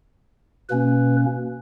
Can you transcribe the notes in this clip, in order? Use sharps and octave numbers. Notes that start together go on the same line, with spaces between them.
B2 A#3 C#4 B4